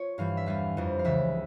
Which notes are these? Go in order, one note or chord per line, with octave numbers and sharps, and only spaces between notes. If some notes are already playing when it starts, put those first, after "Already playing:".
Already playing: F4 C#5
G2 E3 G3 F5
E5
E2 E3 G3 F5
F2 E3 G3
F5
C#2 C#3 E3 G3 E5